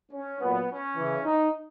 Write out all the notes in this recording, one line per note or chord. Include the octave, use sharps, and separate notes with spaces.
C#4
A#2 F#3 B3
C#4
C#3 E3
D#4